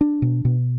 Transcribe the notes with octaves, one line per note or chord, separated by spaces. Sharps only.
D4
B2
B2